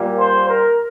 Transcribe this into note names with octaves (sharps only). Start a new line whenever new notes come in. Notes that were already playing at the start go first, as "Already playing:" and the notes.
Already playing: A#2 G3 A#3
C5
A#4